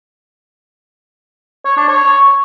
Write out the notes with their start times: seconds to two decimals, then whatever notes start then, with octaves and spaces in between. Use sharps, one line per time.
1.65 C#5
1.77 D4
1.88 C#5